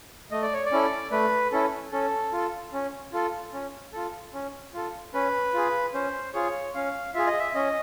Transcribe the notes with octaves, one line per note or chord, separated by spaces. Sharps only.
A3 D#5
D5
C#5
D5
C#4 E4 A4
A3 B4
C#4 E4 A4
C#4 A4
F4 A4
C#4
F4 A4
C#4
F4 A4
C#4
F4 A4
C#4 B4
F4 G#4
C#4 C5
F4 G#4 C#5
C#4 F5
F4 G#4 E5
D#5
E5
C#4 D#5